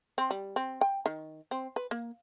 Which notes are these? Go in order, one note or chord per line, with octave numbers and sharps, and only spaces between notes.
C4
G3
C4
G5
D#3
C4
B4
A#3